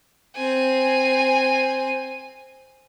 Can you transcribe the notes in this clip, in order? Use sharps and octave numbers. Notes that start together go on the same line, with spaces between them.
C4 G#5